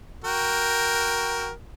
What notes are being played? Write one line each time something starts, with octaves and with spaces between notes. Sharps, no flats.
F#4 A#4 G5